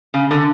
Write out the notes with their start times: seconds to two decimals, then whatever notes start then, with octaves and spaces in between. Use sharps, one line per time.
0.14 C#3
0.31 D3